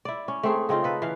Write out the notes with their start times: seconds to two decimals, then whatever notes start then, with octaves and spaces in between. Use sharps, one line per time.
0.05 E4 D5
0.28 C#4
0.43 A3 C4 G#4
0.69 C#3 C4 D#4 F4
0.84 A4 B4
1.02 E3 F5